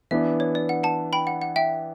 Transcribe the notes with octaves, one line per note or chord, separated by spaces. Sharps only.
E3 B3 D4 E5
C#5
D5
F#5
F#5 A5
G5 B5
F#5
F#5
E5 G5